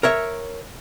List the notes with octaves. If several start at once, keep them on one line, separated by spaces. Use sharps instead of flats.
A#4 C#5 E5